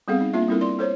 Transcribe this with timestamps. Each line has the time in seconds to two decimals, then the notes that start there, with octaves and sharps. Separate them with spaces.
0.08 G3 B3 C4 G#4 A4 F5
0.21 D#4
0.33 A#3 D4 F4 E5
0.48 G3 C4 E4 A4 A#4
0.61 D5 C6
0.79 A4 C5 C#5